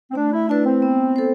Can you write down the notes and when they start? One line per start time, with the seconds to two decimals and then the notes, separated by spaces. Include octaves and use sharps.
0.11 C4
0.15 A3 D4
0.32 E4
0.49 D4 E4 B4
0.65 C4
0.82 B3
1.16 A4 C5